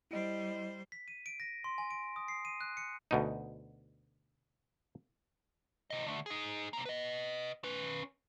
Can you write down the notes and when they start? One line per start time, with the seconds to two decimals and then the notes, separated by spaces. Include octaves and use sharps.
0.11 G3 E4 C5 D#5
0.92 B6
1.08 D#7
1.26 D7
1.40 A#6
1.64 C6
1.78 G#5
1.91 D7
2.16 D#6
2.28 C7
2.45 D#7
2.61 F#6
2.77 C#7
3.11 D2 B2 D#4
5.90 C3 D#5
6.07 D3 A3
6.26 D#4 G#4
6.73 C3 A#3
6.85 B4 D#5
7.64 C#4 B4